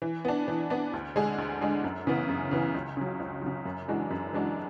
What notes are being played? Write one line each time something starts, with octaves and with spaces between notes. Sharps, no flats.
E3
B3 D4
E3
B3 D4
D2
D3 G#3 D4 G#4
D2
D3 G#3 D4 G#4
F#2
C#3 E3 B3
F#2
C#3 E3 B3
C#2
C#3 F#3
C#2
C#3 F#3
F#2
E3 G#3 D4 F#4
F#2
E3 G#3 D4 F#4